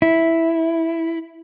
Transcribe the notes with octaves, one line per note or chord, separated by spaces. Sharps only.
E4